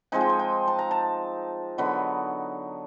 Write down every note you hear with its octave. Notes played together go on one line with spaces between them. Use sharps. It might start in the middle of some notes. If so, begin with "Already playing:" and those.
F3 G#3 C4 D#4 G#5
G5
G#5
G5
A5
A#5
A5
D3 F#3 B3 D#4 B5